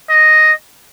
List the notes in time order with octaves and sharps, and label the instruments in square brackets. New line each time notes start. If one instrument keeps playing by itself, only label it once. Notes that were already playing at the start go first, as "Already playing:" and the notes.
[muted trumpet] D#5